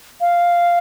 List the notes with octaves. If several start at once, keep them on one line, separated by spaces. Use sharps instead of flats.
F5